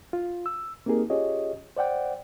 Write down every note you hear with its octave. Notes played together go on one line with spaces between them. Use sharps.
F4
E6
A#3 C4 D#4 G4 G#4 A#4
C#4 F4 G4 G#4 C#5 D#5
C5 D5 F#5 G5